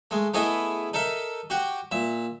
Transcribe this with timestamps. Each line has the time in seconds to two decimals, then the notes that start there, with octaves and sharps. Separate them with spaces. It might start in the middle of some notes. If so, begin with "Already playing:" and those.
0.11 G#3 A3
0.34 A3 B3 E4 G#4 A4 D#5
0.94 D#4 A4 A#4 E5
1.50 F#4 G4 F#5 G5
1.92 A#2 E5